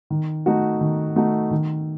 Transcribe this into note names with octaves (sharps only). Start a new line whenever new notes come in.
D#3
A3 D#4 F#4
D#3
A3 D#4 F#4
D#3